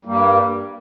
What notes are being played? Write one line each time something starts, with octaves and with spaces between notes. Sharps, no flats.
G2 G3 A#3